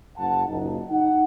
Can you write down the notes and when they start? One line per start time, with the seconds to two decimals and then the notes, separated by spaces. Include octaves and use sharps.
0.17 F#1 F#5 A5
0.48 F#1 F#2 A#2 D#4
0.90 D#4 F#5